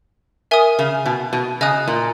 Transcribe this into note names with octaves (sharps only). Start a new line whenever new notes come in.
A#4 E5 G#5 D#6
C#3
B2
B2
C#3 D#5 G#5 D#6 F#6
A#2